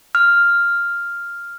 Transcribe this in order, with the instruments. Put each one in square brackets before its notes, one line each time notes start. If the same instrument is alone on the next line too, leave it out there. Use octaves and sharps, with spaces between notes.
[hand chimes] F6